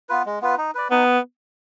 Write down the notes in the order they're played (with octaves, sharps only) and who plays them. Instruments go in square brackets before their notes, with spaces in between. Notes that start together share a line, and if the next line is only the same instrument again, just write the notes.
[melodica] B3 F4 B4
G#3
B3 F4 B4
D#4
B4 D5
[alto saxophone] B3 [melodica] D#4